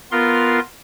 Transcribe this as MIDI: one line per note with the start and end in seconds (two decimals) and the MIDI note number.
0.12 0.60 59
0.12 0.60 65
0.12 0.60 70
0.12 0.60 77
0.12 0.60 84